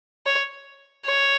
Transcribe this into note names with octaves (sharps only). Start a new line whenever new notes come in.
C#5
C#5